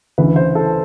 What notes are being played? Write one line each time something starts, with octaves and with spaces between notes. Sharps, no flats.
D2 C#3 E3 B4
C5
A4